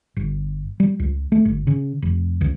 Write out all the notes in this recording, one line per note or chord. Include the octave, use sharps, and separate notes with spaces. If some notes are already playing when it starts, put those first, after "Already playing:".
G1
G3
C#2
A3
G1
C#3
F1
C#2